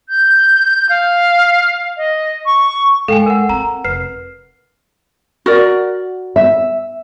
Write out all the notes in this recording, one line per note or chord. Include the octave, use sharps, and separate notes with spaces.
G6
F5
D#5
C#6
G#2 A4 F5 G5 G#5
A#4 F#5
C4 A#5
F1 B4 C7
F#4 A#4 D5
E5